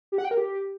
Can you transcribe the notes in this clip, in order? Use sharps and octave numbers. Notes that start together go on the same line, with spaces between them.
G4
F#5
G5
A#4
G4